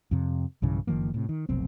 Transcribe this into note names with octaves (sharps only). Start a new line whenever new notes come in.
F2 C3
B1 G2 C#3 E3
F#1 D#3 F3 A#3
A2 C3
D#3
F1 B1 C4